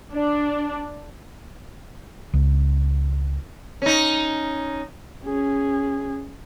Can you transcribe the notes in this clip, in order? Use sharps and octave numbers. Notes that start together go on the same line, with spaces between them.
D4
C#2
C#4 D#4
C#4 G#4